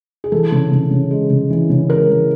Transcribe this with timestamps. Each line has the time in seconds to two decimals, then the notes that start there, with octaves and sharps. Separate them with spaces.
0.24 G#4
0.32 E3 A4
0.52 C#3
0.72 C#3
0.91 C#3
1.11 G#3
1.30 C#3
1.50 E3
1.70 C#3
1.90 G#3 A#4
2.09 E3